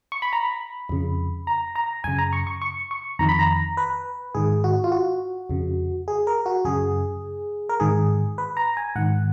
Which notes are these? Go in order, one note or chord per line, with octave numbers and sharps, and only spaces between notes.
C#6
B5
A#5
B5
F2 C#3
A#5
A#5
F#2 C#3 G#5
A#5
C#6
C#6
C#6
C#6
F2 D#3 A#5
B5
A#5
B4
G#2 D#3 G#4
F#4
F4
F#4
F2 C#3
G#4
A#4
F#4
F#2 C#3 G#4
A#4
G#2 D#3 G#4
B4
A#5
G#5
G#2 D#3 F#5